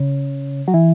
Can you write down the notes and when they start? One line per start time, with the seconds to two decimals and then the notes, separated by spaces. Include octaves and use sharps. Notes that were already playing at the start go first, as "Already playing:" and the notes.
Already playing: C#3
0.68 F#3
0.74 E3